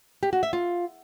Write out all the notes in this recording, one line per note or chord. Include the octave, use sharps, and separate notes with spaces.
G4
F#4
E5
F4